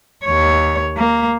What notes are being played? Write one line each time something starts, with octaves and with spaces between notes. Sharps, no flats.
D#2 C#5
A#3